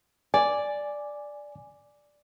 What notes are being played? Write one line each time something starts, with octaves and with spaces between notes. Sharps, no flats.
D5 G#5